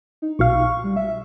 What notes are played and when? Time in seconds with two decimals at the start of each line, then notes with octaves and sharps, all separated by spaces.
0.22 D#4
0.39 B1 B2 F5 C#6
0.84 G3
0.96 E5